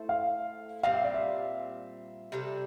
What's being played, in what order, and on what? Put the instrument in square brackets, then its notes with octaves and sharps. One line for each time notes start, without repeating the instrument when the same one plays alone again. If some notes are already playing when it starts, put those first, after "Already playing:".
Already playing: [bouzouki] A3 E4 A4 C5
[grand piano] F5
[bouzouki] A#2 G3 C4 [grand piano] F5
[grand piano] E5
D5
E5
[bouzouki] C3 G3 D4 A4